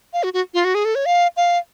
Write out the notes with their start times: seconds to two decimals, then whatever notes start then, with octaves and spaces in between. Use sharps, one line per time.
0.13 F5
0.23 F#4
0.33 F#4
0.54 F4
0.64 F#4
0.75 G#4
0.85 A4
0.95 C#5
1.06 F5
1.36 F5